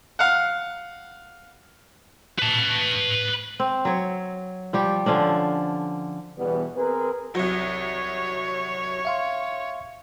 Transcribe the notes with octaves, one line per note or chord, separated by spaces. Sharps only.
F5 F#5
B4 A5
C4
F#3 C#5
F3 G3 G4
D3 F3 C#4 D4
E2 B2 E3 G3 B3
C4 G#4 A#4 B4
C2 F#3 C#5
E5 F5 C6